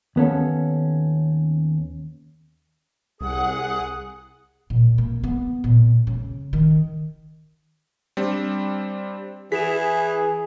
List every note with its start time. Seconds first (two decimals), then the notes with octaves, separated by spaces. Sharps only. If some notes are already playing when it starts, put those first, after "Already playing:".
0.16 D#2 B3 C#4 A4
3.21 C2 G#4 F#5 D#6
4.70 A#2
4.98 A#3
5.24 B3
5.64 A#2
6.07 C#3
6.53 D#3
8.17 G3 C4 D4
9.52 E3 G#4 B6 E7